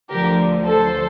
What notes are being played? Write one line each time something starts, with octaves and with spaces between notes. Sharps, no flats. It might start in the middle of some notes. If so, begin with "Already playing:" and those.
D2 D3 F3 G4 A#4
A4 C5